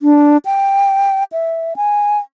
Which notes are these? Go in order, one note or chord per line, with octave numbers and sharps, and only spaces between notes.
D4
G5
E5
G#5